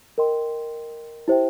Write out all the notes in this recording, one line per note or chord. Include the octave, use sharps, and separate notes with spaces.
A#4 D#5 G5 C6
E4 G4 C5 E5 G5